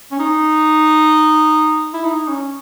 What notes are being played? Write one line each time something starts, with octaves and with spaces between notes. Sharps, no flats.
C#4
D#4
E4
D#4
C#4